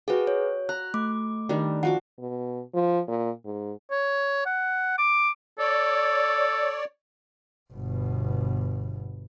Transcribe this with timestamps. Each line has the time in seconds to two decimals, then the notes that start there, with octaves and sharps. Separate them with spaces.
0.08 F#4 G#4 B4 D#5 G5
0.27 C#5
0.69 A#5 F#6
0.94 A3 D6
1.49 D#3 G3 D4
1.83 F3 F#4 F#5 D6
2.19 B2
2.74 F3
3.08 A#2
3.45 G#2
3.91 C#5
4.46 F#5
4.98 D6
5.59 A4 C#5 D5
7.72 G1 B2